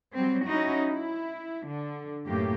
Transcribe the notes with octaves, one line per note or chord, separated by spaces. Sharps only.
F#3 G3 C4
C#4 D#4 E4 F#4
E4
D3
F#2 A2 A#3 G4